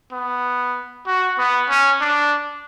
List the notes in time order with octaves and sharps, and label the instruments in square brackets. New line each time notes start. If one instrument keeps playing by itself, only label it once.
[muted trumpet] B3
F#4
B3
C#4
D4